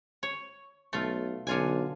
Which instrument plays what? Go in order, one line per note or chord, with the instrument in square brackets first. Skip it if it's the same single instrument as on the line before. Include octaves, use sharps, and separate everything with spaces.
[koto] C#5
[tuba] B1 [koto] A3 F4
[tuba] B1 [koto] D3 F4 G#5